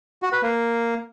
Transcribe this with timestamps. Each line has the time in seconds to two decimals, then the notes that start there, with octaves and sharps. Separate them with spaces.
0.22 F#4
0.33 B4
0.43 A#3